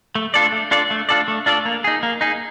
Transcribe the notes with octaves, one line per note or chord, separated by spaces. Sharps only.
A3
D4 F4 A4 D5
A3
D4 F4 A4 D5
A3
D4 F4 A4 D5
A3
D4 F4 A4 D5
A#3
D#4 G#4
A#3
D#4 G#4